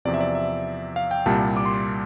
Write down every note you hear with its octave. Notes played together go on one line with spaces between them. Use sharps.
E2 C3 F3 D5
E5
D5
E5
F5
G5
C2 A#2 G3 A5
D6
C6
D6